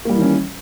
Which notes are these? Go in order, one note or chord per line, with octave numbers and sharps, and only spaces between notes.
D#3 E3 G3 A#3 C#4